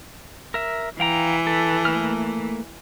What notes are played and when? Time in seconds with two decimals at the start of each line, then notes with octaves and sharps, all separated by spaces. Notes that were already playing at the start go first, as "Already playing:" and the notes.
0.54 A#4 E5
1.00 E3 F5 G5 A#5
1.47 A4
1.85 A3 A#3 F6